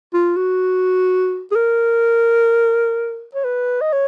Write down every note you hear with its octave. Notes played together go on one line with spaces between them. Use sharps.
F4
F#4
G#4
A#4
C#5
B4
D#5
C#5